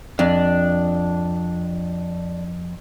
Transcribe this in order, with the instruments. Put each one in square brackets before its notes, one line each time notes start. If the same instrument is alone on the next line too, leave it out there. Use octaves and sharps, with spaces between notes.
[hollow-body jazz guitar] F2 [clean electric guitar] D4